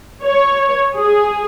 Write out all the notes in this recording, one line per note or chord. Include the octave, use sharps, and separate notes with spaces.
C#5
G#4